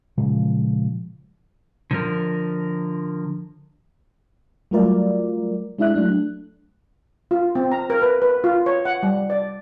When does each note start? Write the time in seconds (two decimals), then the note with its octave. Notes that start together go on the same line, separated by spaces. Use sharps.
0.18 A#2 C#3 F3 G#3
1.91 D3 F3 A#4
4.71 F#3 G3 A3 F4 A#4 D5
5.79 G#3 D4 E4 E5 F#6
5.94 F#3 A3 D4 F#6
7.31 F4
7.55 C4
7.72 A#5
7.90 A#4
8.02 B4
8.22 B4
8.44 F4
8.66 C#5
8.85 F#5
9.03 G3
9.30 D5